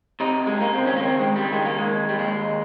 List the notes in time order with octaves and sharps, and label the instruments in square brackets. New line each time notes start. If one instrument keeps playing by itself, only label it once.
[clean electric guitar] C3 D#4
G#3
C#2
A#3
C4
D#3 C#4
A#3
C4
C#2 G#3
G3
D#3 G#3
A#3
G#3
D#2
G3
D#2 G#3